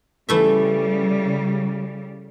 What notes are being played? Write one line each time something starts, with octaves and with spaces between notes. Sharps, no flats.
C#3 E3 G3 A3 E5